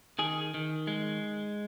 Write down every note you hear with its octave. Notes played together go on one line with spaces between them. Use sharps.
D#3 G#4
D#3
G#3